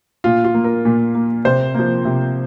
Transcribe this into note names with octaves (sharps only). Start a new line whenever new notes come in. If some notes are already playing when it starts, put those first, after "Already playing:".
A#2 F4
F4
A#3
A#4
A#2
A#3
C3 C5
F3 A#3
C3